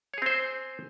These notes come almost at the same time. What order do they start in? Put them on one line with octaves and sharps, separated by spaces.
C#5 G#4 C4 C5